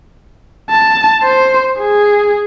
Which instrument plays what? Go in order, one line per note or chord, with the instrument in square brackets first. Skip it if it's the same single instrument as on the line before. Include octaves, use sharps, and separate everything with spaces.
[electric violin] A5
C5
G#4